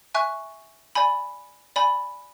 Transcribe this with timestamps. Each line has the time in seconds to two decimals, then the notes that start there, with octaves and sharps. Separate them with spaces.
0.14 E5 G#5 C#6 F#6
0.95 D5 G#5 B5
1.76 D5 G#5 B5